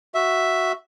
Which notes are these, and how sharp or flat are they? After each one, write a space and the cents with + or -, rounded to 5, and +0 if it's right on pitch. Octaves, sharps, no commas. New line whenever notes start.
F#4 +0 E5 +0